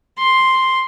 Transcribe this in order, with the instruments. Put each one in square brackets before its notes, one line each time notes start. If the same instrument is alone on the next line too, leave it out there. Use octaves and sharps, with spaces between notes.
[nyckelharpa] C6